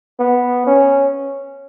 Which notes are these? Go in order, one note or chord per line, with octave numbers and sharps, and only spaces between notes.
B3
C#4